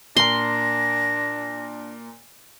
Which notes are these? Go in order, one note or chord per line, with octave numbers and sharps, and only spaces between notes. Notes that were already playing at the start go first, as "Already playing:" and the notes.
A#2 D4 A#4 C6 A#6